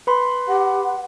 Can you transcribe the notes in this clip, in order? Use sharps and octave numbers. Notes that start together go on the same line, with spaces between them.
B4 B5 C6
G4 F#5